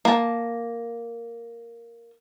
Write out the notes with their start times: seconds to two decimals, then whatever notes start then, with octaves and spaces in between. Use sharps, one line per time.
0.05 A#3 A5